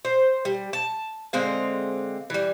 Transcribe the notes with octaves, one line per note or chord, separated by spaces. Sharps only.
C5
G3
A5
D3 G#3 C4 F5
E3 G3